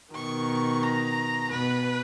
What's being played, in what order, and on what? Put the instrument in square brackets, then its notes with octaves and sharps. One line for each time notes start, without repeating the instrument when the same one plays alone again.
[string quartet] B2 D#3 [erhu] C#6
[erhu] A#5
[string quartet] B2 [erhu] B4